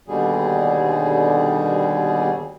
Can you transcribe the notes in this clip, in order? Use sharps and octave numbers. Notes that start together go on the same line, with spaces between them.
D#2 B2 D3 G3 G#4